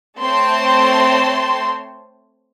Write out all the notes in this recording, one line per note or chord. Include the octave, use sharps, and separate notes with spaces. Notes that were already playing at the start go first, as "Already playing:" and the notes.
A3 C4 C5 C#5 A5 C6